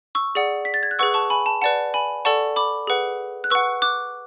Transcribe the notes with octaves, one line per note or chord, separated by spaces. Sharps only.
C#6 E6
G#4 D5 F#5
B6
A6
G#6
F#6
G#4 B4 F#5 C#6 E6
A5 C#6
G#5 B5
A5
B4 D5 F#5 A5
G#5 B5
A4 D5 F#5 A5 C#6
B5 D6
G#4 B4 F#5
F#6
B4 F#5 C#6 E6
D6 F#6